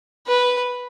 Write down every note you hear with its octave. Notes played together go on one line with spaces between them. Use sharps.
B4